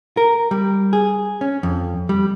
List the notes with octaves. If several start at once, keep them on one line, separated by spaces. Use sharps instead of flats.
A#4
G3
G#4
C#4
F2
G3